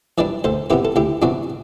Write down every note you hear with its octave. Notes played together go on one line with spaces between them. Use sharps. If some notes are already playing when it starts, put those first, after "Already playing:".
E3 G3 D4 B4 D5
D2 A4 C5
C3 E3 B3 G4 B4
A4
D2 E4 G4
C3 E3 B3 D4 F#4